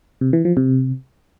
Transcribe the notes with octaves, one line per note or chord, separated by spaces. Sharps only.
C3
E3
F3
C3